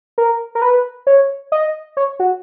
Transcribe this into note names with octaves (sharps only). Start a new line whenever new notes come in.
A#4
A#4
B4
C#5
D#5
C#5
F#4